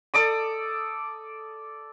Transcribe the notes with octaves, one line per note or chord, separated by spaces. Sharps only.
A4 D5 D6 D#6